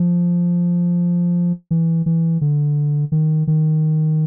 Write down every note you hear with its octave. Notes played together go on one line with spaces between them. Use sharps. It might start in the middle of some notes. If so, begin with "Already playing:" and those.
Already playing: F3
E3
E3
D3
D#3
D#3